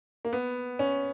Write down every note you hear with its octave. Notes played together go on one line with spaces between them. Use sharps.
A#3
B3
C#4